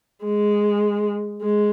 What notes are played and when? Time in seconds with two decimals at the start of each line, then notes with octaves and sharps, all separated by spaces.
0.25 G#3
1.42 G#3